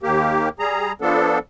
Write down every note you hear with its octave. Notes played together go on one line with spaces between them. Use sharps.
D#2 A#3 G4
G3 G#4 A#5
F3 B3 D4 A4